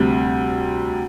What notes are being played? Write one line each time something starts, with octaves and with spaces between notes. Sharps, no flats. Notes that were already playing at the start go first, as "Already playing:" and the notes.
Already playing: D2 C3 G3 C4